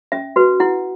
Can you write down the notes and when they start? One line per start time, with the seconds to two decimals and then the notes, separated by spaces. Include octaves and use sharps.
0.12 C#4 E5
0.36 F#4 B4
0.60 E4 F#5